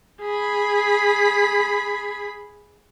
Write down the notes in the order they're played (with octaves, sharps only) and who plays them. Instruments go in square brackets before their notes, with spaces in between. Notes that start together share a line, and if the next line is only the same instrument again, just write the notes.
[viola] G#4 B5